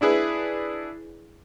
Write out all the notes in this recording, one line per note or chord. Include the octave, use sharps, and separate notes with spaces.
D4 E4 G#4 B4